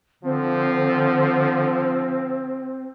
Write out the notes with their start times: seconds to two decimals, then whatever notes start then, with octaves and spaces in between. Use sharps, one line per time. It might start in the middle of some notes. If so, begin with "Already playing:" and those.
0.24 D3 F3 C4